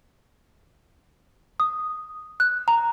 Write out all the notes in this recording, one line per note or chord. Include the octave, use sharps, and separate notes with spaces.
D#6
F#6
A#5